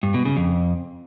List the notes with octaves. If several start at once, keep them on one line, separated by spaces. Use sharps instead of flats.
G2
B2
C#3
F2